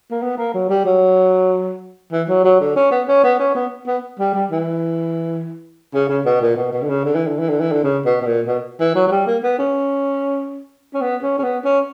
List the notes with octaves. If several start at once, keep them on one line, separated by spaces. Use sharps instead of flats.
A#3
B3
A#3
F#3
G3
F#3
E3
F#3
F#3
D3
C#4
B3
C#4
B3
C#4
B3
B3
G3
G3
E3
C#3
C#3
B2
A#2
B2
B2
D3
C#3
D3
E3
D3
E3
D3
E3
D3
C#3
B2
B2
A#2
B2
E3
F#3
F#3
G3
A#3
B3
C#4
C#4
B3
C#4
C#4
B3
C#4